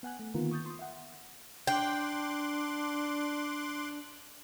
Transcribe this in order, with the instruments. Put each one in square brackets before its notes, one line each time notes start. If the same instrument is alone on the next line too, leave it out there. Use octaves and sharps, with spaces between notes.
[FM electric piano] B3 F#5 G#5 F#6
A3
D3 D#3 A#3 B3 F4 A#4
C#6 D#6 G6 A6
C6 D#6
E5 F#5
[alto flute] D4 [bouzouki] G5 [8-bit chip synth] C6 D6 F#6